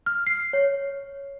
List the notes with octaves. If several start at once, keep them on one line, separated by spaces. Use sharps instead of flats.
F6
C7
C#5